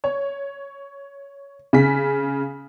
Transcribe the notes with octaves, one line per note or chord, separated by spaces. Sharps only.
C#5
C#3 B6